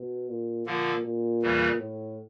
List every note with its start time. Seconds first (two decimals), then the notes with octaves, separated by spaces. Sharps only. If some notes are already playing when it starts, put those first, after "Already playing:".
Already playing: B2
0.29 A#2
0.66 A#2 D3 F3 A#3
1.04 A#2
1.42 E2 C#3 E3 G3
1.79 A2